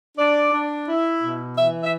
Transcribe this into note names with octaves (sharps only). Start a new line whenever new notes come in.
D4 D5
D4
E4
B2
E3 E5
E5